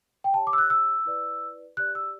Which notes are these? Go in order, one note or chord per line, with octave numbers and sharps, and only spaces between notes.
G5
G4 C#5 A5
D6
E6
F#6
E6
E4 B4 D5
G4 D5 F#6
E6